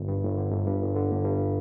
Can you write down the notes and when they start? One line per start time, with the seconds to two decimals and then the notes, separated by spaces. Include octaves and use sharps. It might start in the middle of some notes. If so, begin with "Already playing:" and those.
Already playing: G1
0.08 G2
0.23 G1
0.37 D3
0.52 G1
0.67 G2
0.81 G1
0.96 D3
1.10 G1
1.25 G2